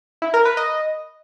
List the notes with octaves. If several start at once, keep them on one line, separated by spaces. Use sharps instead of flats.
E4
A#4
B4
D#5